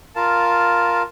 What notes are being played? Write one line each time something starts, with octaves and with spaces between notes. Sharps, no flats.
F4 A#4 F5 A5